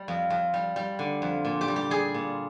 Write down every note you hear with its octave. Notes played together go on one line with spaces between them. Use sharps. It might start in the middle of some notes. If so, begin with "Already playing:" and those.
Already playing: G3
F2
F2
G3
G3
D3
F2
A#2
G4
G3
G4
G3 G#4
A#2